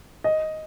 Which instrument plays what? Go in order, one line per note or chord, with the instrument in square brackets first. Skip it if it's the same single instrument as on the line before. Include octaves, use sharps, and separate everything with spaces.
[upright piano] D#5